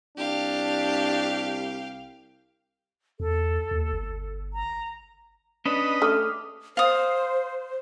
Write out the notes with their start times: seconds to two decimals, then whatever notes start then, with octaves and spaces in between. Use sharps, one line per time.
0.17 C2 D4 G4 F5
3.20 E2 A4
3.71 D#2
3.93 G1
4.53 A#5
5.65 C#4 D4 B4 D#5
6.02 A3 D6 D#6 F6
6.77 C5 F5 D#6